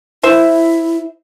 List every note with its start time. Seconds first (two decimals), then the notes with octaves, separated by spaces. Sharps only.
0.23 E4 C5 E5